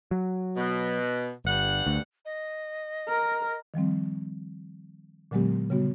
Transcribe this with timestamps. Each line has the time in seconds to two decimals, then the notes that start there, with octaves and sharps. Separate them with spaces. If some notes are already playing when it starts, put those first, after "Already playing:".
0.11 F#3
0.56 B2
1.45 G1 G2 F#5
1.87 D2
2.25 D#5
3.08 A#4
3.74 D#3 F3 G3 C4
5.31 A#2 D3 F#3 G#3 B3 G4
5.70 C#3 G3 B3 F#4